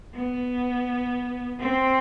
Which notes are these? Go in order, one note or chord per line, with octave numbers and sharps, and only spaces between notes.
B3
C4